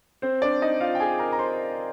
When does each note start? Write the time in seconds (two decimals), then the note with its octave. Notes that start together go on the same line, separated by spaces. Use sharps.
0.22 C4 C5
0.42 D4 D5
0.62 D#4 D#5
0.81 F4 F5
0.95 G5
1.00 G#4 G#5
1.19 A#4 A#5
1.32 A#5
1.39 C5 C6